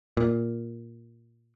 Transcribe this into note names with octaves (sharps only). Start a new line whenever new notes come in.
A#2